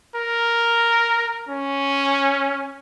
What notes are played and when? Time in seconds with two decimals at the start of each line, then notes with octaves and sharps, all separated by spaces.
0.15 A#4
1.49 C#4